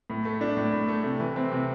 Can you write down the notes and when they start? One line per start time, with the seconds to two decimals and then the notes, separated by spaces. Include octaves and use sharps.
0.10 A2
0.25 A3
0.41 D4
0.57 A2
0.73 A2
0.88 A3
1.04 C3
1.20 E3
1.36 C4
1.51 C3